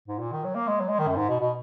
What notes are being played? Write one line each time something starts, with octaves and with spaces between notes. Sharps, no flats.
G#2
A#2
D#3
F#3
A#3
G#3
F#3
G#3
D#3
F#2
G#2
B2
B2